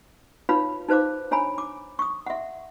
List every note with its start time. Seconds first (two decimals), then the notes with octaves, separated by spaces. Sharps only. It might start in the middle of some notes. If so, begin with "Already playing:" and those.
0.49 D#4 F4 B4 C#5 F5 B5
0.89 D#4 B4 C5 F5 D6
1.31 D4 C#5 G#5 A#5 B5
1.58 D6
1.99 C#6 D#6
2.26 E5 F#5